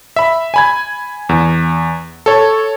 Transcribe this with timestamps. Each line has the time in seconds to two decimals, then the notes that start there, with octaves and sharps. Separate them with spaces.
0.16 E5 B5
0.54 G#5 B5 G#6
1.29 E2
2.26 A4 C#5